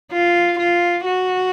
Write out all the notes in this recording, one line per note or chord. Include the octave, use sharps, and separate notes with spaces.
F4
F4
F#4